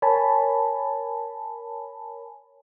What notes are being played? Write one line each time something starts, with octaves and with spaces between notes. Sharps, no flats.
A#4 C#5 G#5 A5 B5